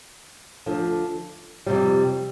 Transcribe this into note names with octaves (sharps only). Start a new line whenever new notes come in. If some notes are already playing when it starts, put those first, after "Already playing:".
D2 D3 F3
F2 C3 G3